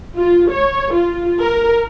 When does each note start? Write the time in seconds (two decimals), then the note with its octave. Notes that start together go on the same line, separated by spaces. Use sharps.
0.15 F4
0.49 C#5
0.92 F4
1.40 A#4